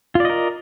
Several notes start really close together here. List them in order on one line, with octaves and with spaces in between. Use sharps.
F4 D5 D#5 A#4